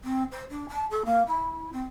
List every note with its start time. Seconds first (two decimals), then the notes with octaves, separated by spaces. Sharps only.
0.04 C4
0.32 C5
0.50 D4
0.69 A5
0.91 A4
1.05 A#3
1.27 E4
1.73 C4